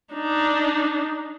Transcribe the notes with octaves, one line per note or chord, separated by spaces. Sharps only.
D4 D#4